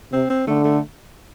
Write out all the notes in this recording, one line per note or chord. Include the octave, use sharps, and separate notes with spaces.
C3 C4
C4
D3 A3
A3